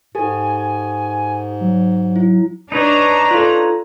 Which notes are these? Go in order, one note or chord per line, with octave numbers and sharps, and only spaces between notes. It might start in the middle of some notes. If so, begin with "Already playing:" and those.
G#2 G4 A4 G#5
F#3
E4
D4 D#4 B4 C#5 A#5
F4 A4